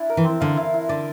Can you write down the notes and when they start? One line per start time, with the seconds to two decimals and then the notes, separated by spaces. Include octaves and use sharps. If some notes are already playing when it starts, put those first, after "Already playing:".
Already playing: D4 E4
0.10 A#4
0.17 E3
0.24 C4
0.41 D3 F5
0.57 E4
0.74 E4
0.89 D3 D5